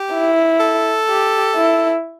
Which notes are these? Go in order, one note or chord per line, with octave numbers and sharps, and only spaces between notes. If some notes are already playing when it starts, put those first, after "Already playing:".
Already playing: G4
E4
A4
G4
E4